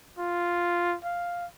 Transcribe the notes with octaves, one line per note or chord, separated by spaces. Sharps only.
F4
F5